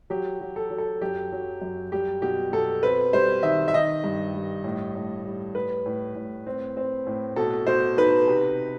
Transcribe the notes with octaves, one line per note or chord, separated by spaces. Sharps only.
F#3 G4
F#3
A4
F#3
A4
F#2 G4
F#3
F#2
G3 G4
B2 G4
B2 A4
C4 B4
G3 C5
D#3 E5
E5
D#3 D#5
G2
G3
A2
A2
G3
A2 B4
A2
A2
C4
C4
A2
B2 A4
B2 C5
D#4 B4
C3